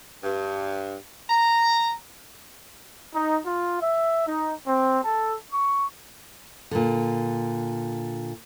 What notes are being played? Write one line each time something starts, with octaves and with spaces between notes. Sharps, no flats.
G2
A#5
D#4
F4
E5
D#4
C4
A4
C#6
A#2 D3